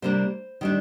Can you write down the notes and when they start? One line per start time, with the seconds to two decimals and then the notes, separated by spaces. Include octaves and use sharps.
0.02 C3 G3 A#3 D4 C5
0.61 D#3 G3 D4